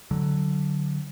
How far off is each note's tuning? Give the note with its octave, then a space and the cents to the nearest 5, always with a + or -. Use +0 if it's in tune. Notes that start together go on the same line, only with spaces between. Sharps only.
D3 +0 F#3 +0